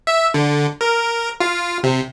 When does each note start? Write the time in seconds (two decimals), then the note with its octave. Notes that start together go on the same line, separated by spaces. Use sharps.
0.07 E5
0.34 D3
0.81 A#4
1.40 F4
1.83 C3